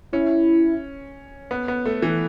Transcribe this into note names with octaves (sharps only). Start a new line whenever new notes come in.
C#4 E4
B3
B3
A3
E3